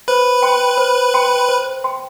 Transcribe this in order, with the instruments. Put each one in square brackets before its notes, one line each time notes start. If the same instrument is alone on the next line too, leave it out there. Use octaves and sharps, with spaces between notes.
[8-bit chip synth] B4 B5 [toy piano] C5
[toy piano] G5 C6
C5
G5 C6
C5
G5 C6